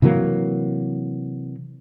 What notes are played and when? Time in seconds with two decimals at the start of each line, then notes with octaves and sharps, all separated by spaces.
0.02 C3 E3 F#3 A#3